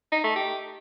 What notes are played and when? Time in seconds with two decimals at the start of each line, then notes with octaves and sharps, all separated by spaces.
0.12 D#4
0.24 A3
0.36 G4